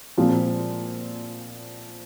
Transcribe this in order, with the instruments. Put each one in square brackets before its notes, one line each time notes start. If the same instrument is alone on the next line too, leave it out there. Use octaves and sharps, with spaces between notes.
[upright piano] A#2 F3 G#3 C4 F4